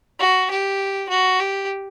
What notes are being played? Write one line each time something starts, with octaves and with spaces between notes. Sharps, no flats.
F#4
G4
F#4
G4